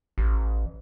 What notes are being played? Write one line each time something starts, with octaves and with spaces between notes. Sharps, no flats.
A1